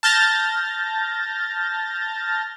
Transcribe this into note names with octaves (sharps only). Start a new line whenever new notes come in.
A5 F6 G6 A6 A#6